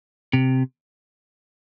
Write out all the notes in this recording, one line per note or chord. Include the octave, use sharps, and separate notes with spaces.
C3